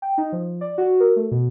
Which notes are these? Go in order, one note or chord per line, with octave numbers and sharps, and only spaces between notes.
G5
D#4
F3
D5
F#4
A#4
A3
B2